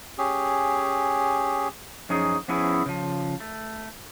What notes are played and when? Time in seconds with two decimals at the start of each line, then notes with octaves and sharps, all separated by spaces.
0.18 C#4 G4 G#4
2.09 F#2 F3 C#4 D#4 G#4
2.48 F3 B3 C#4 E4 G#4 B4
2.86 C#3 F3
3.40 A3